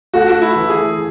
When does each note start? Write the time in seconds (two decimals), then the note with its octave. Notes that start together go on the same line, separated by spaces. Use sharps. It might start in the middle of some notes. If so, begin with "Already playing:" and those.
0.14 A3 F#4
0.30 F#4
0.42 E4
0.56 E3
0.69 G#4